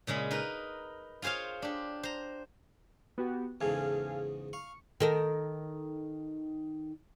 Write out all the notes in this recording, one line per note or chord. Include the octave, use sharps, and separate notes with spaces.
A#2 C#3 G#3 B5
D#4 A#4 B4
F4 G#4 C5 C#5 F5
D4 G4
C5 A#5
B3 F#4 G4
E2 G#2 C#3 A4 F5 G#5
F5 C#6
D#3 A4 A#4